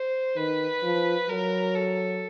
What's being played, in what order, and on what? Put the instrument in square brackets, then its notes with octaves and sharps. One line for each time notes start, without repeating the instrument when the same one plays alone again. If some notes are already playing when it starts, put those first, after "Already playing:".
Already playing: [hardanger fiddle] C5
[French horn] D#3 [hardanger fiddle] B4
[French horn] F3
[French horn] F#3 [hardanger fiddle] A#4
[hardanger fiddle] A4